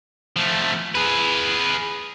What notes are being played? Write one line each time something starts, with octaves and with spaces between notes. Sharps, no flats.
F3 A3
G#4 B4